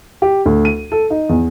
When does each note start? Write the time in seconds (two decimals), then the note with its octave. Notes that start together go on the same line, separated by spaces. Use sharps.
0.22 G4
0.46 D2
0.65 D#7
0.92 A4
1.10 D#4
1.29 E2